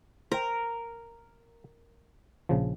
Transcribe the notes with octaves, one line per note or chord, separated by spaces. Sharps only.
A#4 C5 G5
A#1 C#3 F3